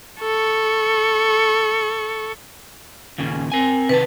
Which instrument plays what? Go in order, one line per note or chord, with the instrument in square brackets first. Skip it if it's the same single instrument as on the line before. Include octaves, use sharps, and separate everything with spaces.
[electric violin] A4 C#6
[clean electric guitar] D#2 A#2 C#3 [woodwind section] C#4
[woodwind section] C4 [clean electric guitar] A#4 G#5
[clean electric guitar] C3 D#3 A5 [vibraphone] B4